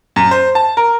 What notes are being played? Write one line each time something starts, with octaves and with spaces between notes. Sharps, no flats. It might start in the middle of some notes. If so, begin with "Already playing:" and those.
F#2
C5
A5
A#4